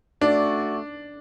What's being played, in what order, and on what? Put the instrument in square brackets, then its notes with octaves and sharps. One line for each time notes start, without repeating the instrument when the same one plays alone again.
[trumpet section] A3 F#4 D5 [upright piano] D4